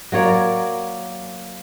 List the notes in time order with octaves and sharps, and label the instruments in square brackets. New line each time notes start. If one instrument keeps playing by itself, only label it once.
[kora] F#3 A#3 C#5 D5